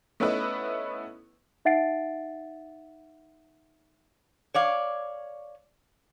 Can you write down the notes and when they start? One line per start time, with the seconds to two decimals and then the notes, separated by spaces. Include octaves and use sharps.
0.20 A3 B3 C#4 D#4 E4 B4
1.65 D#4 E5 F#5 A6 C7 D7
4.54 C#5 D5 F5